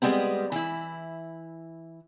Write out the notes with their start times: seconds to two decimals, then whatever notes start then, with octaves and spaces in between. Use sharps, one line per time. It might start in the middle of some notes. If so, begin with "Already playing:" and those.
0.02 G3 G#3 B3 C4
0.52 E3 E4